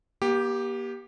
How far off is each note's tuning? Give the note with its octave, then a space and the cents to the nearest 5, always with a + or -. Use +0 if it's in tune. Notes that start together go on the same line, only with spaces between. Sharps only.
A#3 +40 G4 +0